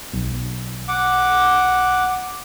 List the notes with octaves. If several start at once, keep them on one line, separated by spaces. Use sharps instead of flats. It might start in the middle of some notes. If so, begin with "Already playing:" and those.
B1
F#5 D6